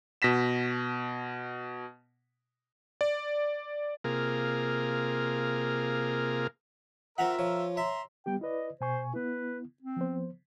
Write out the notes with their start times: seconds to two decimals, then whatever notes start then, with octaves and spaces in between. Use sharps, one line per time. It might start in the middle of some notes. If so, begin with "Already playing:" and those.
0.22 B2 A#6 B6 E7
3.01 D5
4.04 C3 A#3 F4 G#4 A#4
7.18 C4 F4 A#4 E5 F#5 A#5 B5
7.39 F3 C#5
7.77 E5 A#5 C6
8.26 G3 B3 G4 G5
8.41 E4 B4 D5 D#5
8.81 B2 C5 G#5 C#6
9.13 B3 E4 B4
9.82 C4
9.97 F3 B3 C5